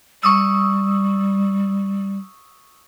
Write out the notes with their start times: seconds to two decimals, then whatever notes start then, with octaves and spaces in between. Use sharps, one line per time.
0.23 G3 C#6 D#6 E6